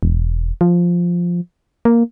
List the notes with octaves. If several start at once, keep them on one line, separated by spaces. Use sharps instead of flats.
E1
F3
A#3